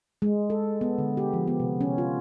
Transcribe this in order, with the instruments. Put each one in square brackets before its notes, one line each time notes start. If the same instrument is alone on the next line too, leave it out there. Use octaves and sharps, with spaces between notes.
[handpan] G#3
A4
B3
D3
G4
F3
B3
C3
C#4
F4